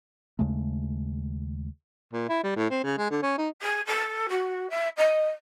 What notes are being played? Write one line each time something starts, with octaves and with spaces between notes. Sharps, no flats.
D#2 C#3 G#3 A3
A#2
E4
G3
A2
C4
C#3
G#3
D3
C#4
D#4
G#4
A4
F#4
E5
D#5